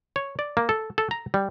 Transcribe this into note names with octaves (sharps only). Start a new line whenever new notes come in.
C#5
D5
A#3
A4
A4
A#5
G3